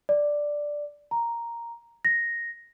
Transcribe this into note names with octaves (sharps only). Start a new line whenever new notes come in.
D5
A#5
A#6